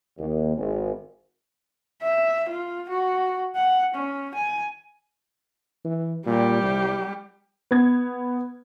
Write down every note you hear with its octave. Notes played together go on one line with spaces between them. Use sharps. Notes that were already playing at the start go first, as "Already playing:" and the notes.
D#2
G#1
E5
F4
F#4
F#5
C#4
G#5
E3
A#2 G3 G4
C2
B3 G#6